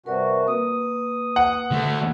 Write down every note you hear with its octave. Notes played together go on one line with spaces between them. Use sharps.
G2 C3 F#4 A#4 B4 D5
A#3 B4 D#6
F#5
D3 A3